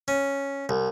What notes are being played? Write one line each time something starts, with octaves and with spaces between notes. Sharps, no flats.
C#4
C2